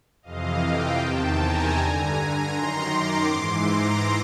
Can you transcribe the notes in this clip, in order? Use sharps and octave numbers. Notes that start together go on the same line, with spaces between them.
F2 C3 E3 D#5 F5
F5 G5
E2 C3 D#3 G5 A5
G#5 A#5
G2 D3
F#2 D#3 A#5 C6
C6 D6
G#2 E3
A#5 C6